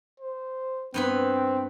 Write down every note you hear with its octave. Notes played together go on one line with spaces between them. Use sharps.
C5
G2 B3 C4 B4